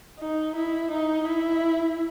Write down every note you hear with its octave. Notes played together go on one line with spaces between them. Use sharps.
D#4
E4
D#4
E4